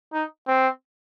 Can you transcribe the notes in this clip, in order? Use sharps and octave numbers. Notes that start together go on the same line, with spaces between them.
D#4
C4